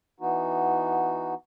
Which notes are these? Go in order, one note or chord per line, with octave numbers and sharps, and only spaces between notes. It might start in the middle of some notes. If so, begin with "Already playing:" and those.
E3 B3 D#4 F#4